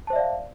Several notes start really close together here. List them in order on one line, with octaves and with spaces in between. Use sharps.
A5 C5 E5 D5 F5